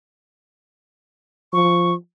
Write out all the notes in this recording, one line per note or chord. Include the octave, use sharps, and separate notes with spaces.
F3 C#6